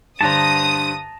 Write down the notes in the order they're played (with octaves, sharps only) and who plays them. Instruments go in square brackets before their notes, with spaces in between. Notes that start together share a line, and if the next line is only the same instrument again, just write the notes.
[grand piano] G2 D3 C5 [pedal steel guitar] A5 A#5 [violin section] D#6